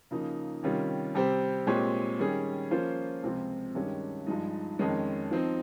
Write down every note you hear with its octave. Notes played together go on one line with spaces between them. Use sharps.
C#3 F3 A#3 D#4
C3 D#3 G3 C#4 F4
C3 G3 C4 G4 C5
A#2 G#3 C4 G4 C#5
D#3 G3 C#4 G#4
F3 A#3 C#4 F4 C5
C#2 C3 F3 C4 F4
G2 D#3 G#3 C#4 G4
G2 F3 G#3 D#4
F2 D#3 G#3 C#4
F3 C4 D#4